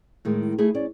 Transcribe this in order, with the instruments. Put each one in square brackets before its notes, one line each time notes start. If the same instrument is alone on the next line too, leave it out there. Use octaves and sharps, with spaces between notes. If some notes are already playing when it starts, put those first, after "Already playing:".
[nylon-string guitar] A2 D#3 G#3
A3 D#4 E4 G#4
C#4 D5